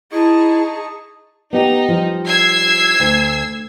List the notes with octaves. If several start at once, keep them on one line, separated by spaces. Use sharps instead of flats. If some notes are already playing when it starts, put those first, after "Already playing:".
D#4 E4 G#4 D#5 A5 C#6
B3 D#4 G4
F3 G3
E6 G#6 C7
D2